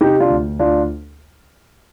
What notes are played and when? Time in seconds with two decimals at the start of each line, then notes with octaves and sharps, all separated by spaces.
0.01 C3 D#4 G4
0.20 D4 F4
0.30 D2
0.59 D2 D4 F4